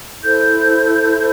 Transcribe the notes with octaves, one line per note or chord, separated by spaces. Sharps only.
E4 A4 C5 G6